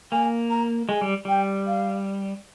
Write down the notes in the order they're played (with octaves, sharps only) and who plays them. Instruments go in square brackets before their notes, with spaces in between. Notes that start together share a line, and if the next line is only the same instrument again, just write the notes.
[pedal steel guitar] A#3 [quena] G#5
[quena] A#5
[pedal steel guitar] G#3 [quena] G#5
[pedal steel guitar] G3
[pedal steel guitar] G3 [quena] G5
[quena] F5